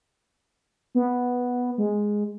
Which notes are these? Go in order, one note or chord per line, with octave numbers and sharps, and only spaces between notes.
B3
G#3